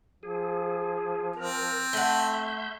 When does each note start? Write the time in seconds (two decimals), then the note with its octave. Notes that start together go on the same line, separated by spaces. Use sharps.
0.23 F3 G#4
1.36 C4 A#4
1.93 A3 E5 F#5 C6 G6